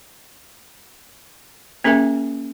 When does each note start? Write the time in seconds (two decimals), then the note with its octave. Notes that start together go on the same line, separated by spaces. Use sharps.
1.84 A#3 C#4 G#4 A#4 E5 G#5